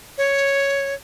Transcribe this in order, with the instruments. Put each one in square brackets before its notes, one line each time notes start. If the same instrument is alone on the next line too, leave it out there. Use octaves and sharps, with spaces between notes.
[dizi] C#5